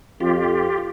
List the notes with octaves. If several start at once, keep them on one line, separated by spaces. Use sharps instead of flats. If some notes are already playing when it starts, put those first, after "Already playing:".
F2 F4 G4